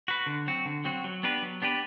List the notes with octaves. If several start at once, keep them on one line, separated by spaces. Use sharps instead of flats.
F#4 B4
D3
F#3 C4 F#4
D3
F#3 C4 F#4
F#3
B3 D4 G4 B4
F#3
B3 D4 G4 B4